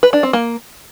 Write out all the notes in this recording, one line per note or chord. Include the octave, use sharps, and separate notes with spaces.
B4
D4
C4
A#3